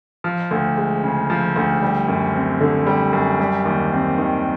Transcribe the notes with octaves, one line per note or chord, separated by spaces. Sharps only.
F3
D2
G#3
C#3
F3
D2
G3
F#2
C4
D3
G3
F#2
G3
D#2
C4
D#3